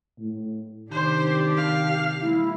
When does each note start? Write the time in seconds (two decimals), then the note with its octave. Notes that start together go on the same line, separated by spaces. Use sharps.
0.19 A2
0.91 C3 D#3 D4 G4 C5
1.57 F5
2.20 E3 G#3 A#3 E4